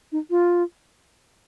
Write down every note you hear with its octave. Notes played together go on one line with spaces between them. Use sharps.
D#4
F4